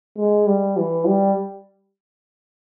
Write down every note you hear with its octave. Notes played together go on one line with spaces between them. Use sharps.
G#3
G3
E3
G3